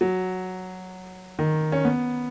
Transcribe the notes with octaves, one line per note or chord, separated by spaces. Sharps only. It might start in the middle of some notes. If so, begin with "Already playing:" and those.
F#3
D#3
C#4
B3